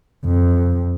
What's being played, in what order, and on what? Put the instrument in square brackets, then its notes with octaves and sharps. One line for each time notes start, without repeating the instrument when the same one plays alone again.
[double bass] F2